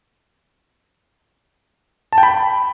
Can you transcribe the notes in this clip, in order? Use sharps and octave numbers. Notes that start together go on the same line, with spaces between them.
A5
G5
B5